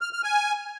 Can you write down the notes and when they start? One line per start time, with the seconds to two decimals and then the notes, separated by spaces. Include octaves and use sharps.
0.01 F6
0.13 F6
0.24 G#5